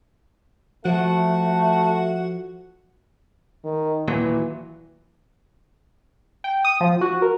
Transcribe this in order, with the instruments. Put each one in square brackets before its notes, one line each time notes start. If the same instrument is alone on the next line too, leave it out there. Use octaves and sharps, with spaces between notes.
[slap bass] F3 [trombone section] A3 [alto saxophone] F#4
[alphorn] D#3
[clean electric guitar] D#2 A#2 F#3 [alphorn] E3
[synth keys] G5
D#6
F3
F#4
A#4